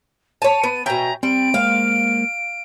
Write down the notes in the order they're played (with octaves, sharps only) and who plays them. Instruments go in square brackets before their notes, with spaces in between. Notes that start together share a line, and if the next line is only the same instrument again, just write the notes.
[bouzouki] C#5 A5 [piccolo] D#7
[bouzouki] B3
[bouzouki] B2 G5 [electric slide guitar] C#5 E5 G#5 [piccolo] A#5
[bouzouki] G3 [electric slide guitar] C4 [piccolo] D7
[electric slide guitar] G#3 A#3 C5 [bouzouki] F5